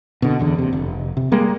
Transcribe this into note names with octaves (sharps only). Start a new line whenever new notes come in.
B2 D3
D#1 E2 D3
D#2 C3
F1
C3
G3 G#3 A#3